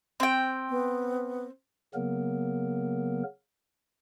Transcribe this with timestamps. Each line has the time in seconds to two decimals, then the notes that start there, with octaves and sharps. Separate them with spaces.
0.20 C4 G5
0.70 B3
1.94 C#3 F#3 A#3 B3 A#4